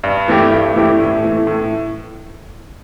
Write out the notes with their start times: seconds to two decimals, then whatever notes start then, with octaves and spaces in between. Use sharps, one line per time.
0.04 G2
0.28 E3 A3 E4 G4
0.52 G2
0.76 E3 A3 E4 G4
0.99 A2
1.23 E3 A3
1.47 A2